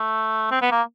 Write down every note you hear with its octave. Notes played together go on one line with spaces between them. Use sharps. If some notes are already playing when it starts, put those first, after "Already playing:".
Already playing: A3
C4
B3
A#3